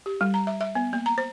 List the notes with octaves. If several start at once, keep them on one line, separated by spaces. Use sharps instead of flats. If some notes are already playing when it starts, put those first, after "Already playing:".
G4
G3
A#5
E5
E5
B3
A#3
A#5
C5